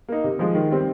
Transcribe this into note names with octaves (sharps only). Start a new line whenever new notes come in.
A#3 D#4
C3
F3 G#3
D#3
G3 C4